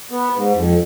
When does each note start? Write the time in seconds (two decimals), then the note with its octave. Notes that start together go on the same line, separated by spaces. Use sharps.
0.11 B3
0.35 G#2
0.55 F2